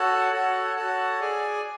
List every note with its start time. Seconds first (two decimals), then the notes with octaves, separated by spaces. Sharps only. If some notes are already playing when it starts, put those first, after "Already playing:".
Already playing: F#4 A4 C#5 F#5 A5
0.33 F#4 A4 C#5 F#5 A5
0.76 F#4 A4 C#5 F#5 A5
1.20 G#4 D5 G#5